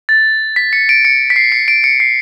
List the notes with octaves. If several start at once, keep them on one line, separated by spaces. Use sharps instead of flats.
A6
B6
C#7
D7
C#7
B6
C7
C#7
D7
C#7
C7